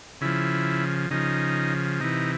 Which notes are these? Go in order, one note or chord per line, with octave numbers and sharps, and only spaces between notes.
C#3 F3 E4
C#3 F3 D#4
C3 E3 D#4